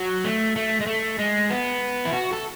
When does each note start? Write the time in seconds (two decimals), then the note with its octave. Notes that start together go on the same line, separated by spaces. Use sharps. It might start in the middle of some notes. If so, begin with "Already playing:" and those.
Already playing: F#3
0.24 A3
0.56 A3
0.80 G#3
0.86 A3
1.19 G#3
1.50 B3
2.05 E4
2.13 F#4
2.33 A4